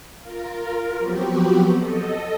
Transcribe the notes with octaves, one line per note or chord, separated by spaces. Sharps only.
F4 A#4
F3 F#3 B3 C4 F#4 G4
A4 D#5